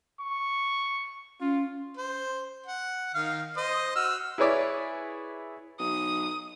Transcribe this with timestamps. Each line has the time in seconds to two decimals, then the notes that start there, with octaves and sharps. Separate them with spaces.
0.20 C#6
1.41 C#4 F4
1.97 C5
2.67 F#5
3.15 D#3 F5 F6
3.57 C5 D#5 D#6
3.96 F#4 E6 F6
4.38 E4 G#4 B4 C#5 D5 E5
5.80 B1 D#6